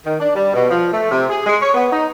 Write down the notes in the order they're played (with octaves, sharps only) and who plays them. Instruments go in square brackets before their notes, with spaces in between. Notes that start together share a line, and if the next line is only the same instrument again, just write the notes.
[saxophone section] D#3
D4
G3
B2
F3
A3
C3
G#4
G#3
C#5
B3
D#4